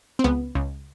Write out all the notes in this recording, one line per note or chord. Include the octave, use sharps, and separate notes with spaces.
C4
C#2 B3
C#2